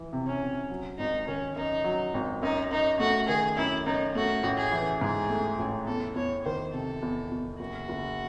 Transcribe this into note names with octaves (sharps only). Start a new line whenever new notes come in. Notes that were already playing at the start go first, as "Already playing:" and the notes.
Already playing: E3
C3
C#4
C3
F#3
G#1 D#4
D#3 C#4
F#2 D#4
F#3
G#1
F#2 D#4
F#2 D#4
A3 F#4
D#3 G#4
F#2 E4
F#2 D#4
A3 F#4
A1
G#4
E3
G#2 G#4
A3
A1
E2 A4
E2 C#5
D#3 C5
C3 A4
E2
E2
F#1 F#4
F#1